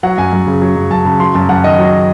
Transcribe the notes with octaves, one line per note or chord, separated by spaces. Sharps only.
F#3 F#5
F#2 G#5
F#2
C#3
F#3
F#2
F#2 A5
C#3
F#3 C6
F#2 A5
F#2 F#5
D#3 D#5
F#3